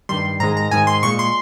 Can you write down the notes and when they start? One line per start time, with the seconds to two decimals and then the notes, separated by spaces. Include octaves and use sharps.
0.09 G2 D#3 G3 C6
0.40 G#2 D#3 G#3 A#5
0.57 A#5
0.71 G#2 D#3 G#3 G#5
0.87 C6
1.03 A#2 G#3 C#6
1.19 C6